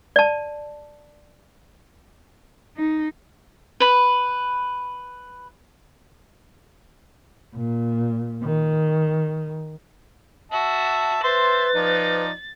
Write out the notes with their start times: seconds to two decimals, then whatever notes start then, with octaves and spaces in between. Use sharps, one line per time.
0.16 D5 A5
2.77 D#4
3.80 B4 B5
7.55 A#2
8.43 D#3
10.52 F#4 E5 A5
11.23 B4 C5 E5 C6 A6
11.75 F3 D#4 D5